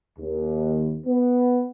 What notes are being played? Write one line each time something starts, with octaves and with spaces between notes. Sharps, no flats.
D#2
B3